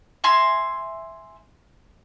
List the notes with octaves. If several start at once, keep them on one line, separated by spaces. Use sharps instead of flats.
E5 G#5 A#5 C6